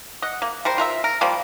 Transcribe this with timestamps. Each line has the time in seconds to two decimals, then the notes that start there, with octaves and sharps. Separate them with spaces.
0.22 D#5 F#5
0.42 A#3
0.65 G3 A#4 C5
0.78 F4 A#4 E5
1.04 A#4
1.21 F3 G3 A#3